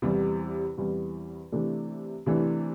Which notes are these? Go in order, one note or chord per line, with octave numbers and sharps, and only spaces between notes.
E2 C3 E3 G3
E2 C3 E3 G3
C3 E3 A3 D4
C3 E3 A3 D4